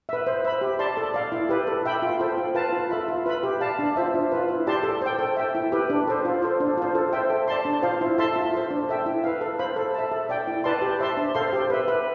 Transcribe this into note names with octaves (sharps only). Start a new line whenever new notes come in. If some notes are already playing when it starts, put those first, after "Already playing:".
B4 E5
C5
E5 B5
G4
D5 A5 C6
A4
D5 F5
E4
G4 B4
A4
E5 G5 B5
F4
A4 C5 G5
F4
B4 F5 A5
F4
A4 E5 B5
F4
B4 E5 B5
G4
D5 F5 A5
D4
F4 C5 E5
D4
F4 B4
E4
G4 D5 A5 C6
A4
C5 G5
A4
E5 G5
E4
G4 B4
D4
A4 C5
F4
A4 C5
D4
F4 C5
A4
C5 E5 G5
A4
D5 A5 C6
D4
F4 C5 F5
E4
A4 E5 A5 C6
F4
A4 C5
D4
A4 E5 G5
E4
B4 F5
A4
C5 F5 B5
A4
E5 A5
A4
D5 G5
E4
B4 D5 A5 C6
G4
C5 E5 A5 C6
D4
A4 C5 F5 C6
G4
B4 E5
B4